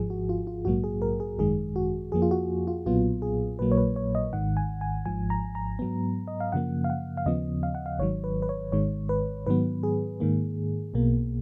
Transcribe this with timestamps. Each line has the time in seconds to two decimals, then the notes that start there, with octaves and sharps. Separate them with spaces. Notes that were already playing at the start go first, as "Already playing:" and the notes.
Already playing: G#1 G#2 F3 G#4
0.10 F#4
0.29 F4
0.47 F4
0.65 A#1 G#2 F#3 A#3 F#4
0.84 G#4
1.02 A#4
1.20 G#4
1.39 G#1 F#2 D#3 G#3 G#4
1.76 F#4
2.12 F2 F3 A#3 G#4
2.22 F4
2.31 F#4
2.67 F4
2.86 B1 A#2 F#3 B3 F4
3.22 G#4
3.59 A#1 A#2 F#3 A#3 B4
3.71 C#5
3.77 B4
3.96 C#5
4.15 D#5
4.32 G#1 G#2 D#3 F#5
4.57 G#5
4.81 G#5
5.06 G#1 G#2 F3 G#5
5.30 A#5
5.55 A#5
5.79 G#2 F#3 B3
6.28 D#5
6.40 F5
6.52 F#2 C#3 F3 A#3 F#5
6.84 F5
6.90 F#5
7.17 F5
7.26 D#2 C#3 F3 B3 D#5
7.63 F5
7.75 F#5
7.86 F5
7.99 G#1 G#2 D#3 F#3 C#5
8.24 B4
8.42 B4
8.49 C#5
8.72 G#1 G#2 D#3 G#3 C#5
9.09 B4
9.46 G#2 D#3 F#3 B3 B4
9.83 G#4
10.20 G#2 D#3 A#3
10.94 B1 B2 A#3